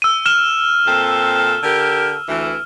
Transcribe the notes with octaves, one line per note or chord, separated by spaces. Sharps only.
E6 D#7
F6 E7
A#2 C4 A4
D3 G4 A#4
D2 E3